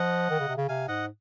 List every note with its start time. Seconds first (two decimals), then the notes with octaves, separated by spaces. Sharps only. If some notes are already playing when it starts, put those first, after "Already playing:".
Already playing: F3 D#5 F#5
0.30 D#3
0.39 C#3
0.48 C3
0.57 C#3
0.69 C3 F5 G#5
0.88 G#2 D#5 F#5